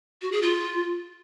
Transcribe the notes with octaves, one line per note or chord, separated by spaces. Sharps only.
F#4
G#4
F4